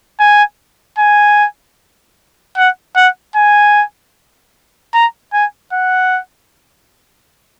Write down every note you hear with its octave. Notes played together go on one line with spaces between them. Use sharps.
G#5
G#5
F#5
F#5
G#5
A#5
G#5
F#5